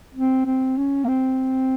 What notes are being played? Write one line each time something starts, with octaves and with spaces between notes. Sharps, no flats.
C4
C4
C#4
A#3
C4